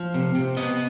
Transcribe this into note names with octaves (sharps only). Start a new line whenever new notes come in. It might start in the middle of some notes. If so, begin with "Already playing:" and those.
Already playing: F3
C3
C3
B3 D#5